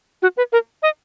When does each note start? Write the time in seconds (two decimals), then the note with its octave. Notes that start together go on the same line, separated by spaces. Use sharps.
0.22 F#4
0.37 B4
0.53 A#4
0.83 D#5